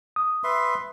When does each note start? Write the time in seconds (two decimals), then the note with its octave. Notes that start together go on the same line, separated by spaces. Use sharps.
0.16 D#6
0.44 B4 E5 C6